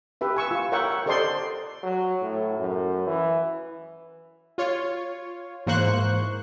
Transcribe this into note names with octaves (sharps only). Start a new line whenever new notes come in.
G4 B4 E5
G#5 C#6 E6
F4
A#4 C#5 E5 F#5 G5 C#6
G4 A4 C5 D5 D#5 C6
F#3
A2
F#2
E3
F4 C#5
G#2 E3 A#3 C5 C#6 F#6